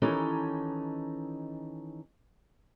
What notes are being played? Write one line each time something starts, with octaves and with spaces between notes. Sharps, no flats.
D#3 E3 C#4 D#4 G4 A4